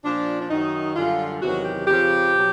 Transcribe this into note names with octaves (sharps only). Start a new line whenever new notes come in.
A#2 F3 D4
D4
F#2 D#3 F#3 D#4
F#2 D3 G3 F4
E2 C3 D#3 F#3 F#4
G4
F2 C#3 F3 G4
B2 F#3